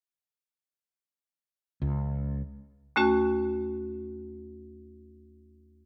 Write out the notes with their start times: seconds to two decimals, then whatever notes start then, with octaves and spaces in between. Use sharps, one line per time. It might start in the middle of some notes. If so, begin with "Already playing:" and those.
1.82 C#2
2.96 D#2 A3 C#4 F#4